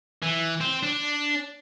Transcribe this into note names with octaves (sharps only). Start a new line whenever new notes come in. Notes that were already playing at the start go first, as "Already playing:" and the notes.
E3
C4
D4